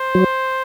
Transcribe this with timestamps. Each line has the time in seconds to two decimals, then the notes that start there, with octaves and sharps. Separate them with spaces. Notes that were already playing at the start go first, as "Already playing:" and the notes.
Already playing: C5
0.15 F#3